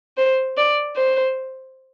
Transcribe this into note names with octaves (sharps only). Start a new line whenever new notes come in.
C5
D5
C5